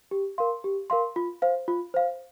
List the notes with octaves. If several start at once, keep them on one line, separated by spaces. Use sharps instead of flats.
G4
A#4 F5 C6
G4
A#4 F5 C6
F4
C5 F5
F4
C5 F5